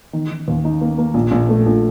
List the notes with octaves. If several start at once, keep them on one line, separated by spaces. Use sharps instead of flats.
D#3
D#3
D#2
D#4
A#3
A#3
A#1
A#1
A3
A#1